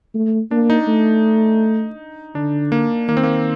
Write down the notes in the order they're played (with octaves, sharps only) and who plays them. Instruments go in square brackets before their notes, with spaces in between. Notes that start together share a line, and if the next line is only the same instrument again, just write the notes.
[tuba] A3
[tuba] A#3 [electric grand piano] D4
[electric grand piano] D#4
[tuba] A3
[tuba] D3 [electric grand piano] D4
[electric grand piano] A#3
[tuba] D#3 [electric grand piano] A#3
[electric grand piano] C4
A#3